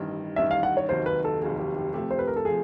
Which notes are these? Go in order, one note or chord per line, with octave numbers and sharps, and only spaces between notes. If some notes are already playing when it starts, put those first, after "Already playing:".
Already playing: A1 G2 D#3
A1 G2 D#3 E5
F5
F#5
C#5
F1 D#2 D#3 F#3 C5
B4
A4
F1 D#2 D#3 F#3 G#4
G4
G4
C3 F3 A3 G4
C5
B4
A#4
A4
C3 F3 G#4